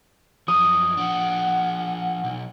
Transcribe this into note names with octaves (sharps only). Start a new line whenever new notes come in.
F#2 F3 D#6
F3 D4 F#5
B1